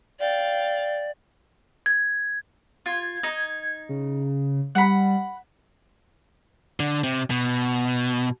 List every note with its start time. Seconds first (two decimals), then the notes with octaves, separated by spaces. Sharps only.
0.19 D5 F5 G5
1.86 G#6
2.86 F4 G#6
3.23 D#4
3.89 C#3
4.75 G3 F#5 B5
6.80 D3
7.04 C3
7.30 B2